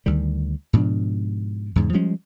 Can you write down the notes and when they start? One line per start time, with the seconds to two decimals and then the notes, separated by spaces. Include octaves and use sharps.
0.06 D2 D#3 G3
0.73 G#2 B2 F3 D4
1.76 E2 G#2 C#3
1.93 F3 G3 G#3 C#4